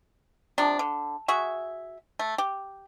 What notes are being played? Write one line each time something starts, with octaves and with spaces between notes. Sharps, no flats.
C3 F3 D4
D3
F#4 G#4 E5
A3
G4